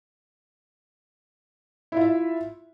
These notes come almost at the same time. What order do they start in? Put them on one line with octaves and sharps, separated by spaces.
E4 F4 E5